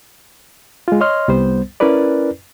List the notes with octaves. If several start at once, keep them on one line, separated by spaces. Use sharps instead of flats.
G#3 F4
C#5 D#5 C6 F6
C2 G3 B3 C5
C#4 E4 A#4 B4 D5